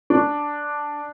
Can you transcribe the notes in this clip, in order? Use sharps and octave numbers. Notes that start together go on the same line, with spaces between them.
D4